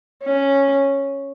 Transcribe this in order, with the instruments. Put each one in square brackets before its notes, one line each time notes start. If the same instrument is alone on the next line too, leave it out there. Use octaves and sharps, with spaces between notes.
[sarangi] C#4